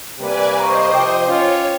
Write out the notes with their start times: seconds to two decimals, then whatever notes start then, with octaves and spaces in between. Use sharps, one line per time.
0.19 C3 G3 A#3 B4 D5 G#5
0.59 C5 D#5 A#5 C#6
0.94 C3 F3 G5 D6
1.26 C#4 F4 C#5